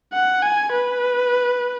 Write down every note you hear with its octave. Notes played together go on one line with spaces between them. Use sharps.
F#5
G#5
B4